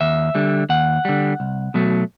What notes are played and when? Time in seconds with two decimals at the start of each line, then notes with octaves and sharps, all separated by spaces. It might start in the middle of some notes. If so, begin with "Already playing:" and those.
0.01 D#2 E5
0.35 D3 G3
0.69 D#2 F#5
1.05 D3 G3
1.40 C2
1.74 B2 F#3 A3